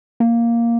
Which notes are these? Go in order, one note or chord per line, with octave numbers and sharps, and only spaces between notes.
A#3